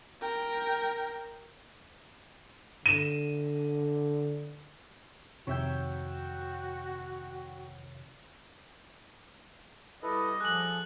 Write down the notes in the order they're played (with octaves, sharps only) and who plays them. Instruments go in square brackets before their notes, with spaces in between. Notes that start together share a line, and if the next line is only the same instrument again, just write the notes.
[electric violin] A#4 G5
[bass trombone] D3 [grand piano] D#7 E7
[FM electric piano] F2 C3 D#3 [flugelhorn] F#4 [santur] C#5 E5 G5
[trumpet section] G3 D#5 [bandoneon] E4 A4 B4
[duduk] F3 [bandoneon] G#4 A4 [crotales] F#6 F#7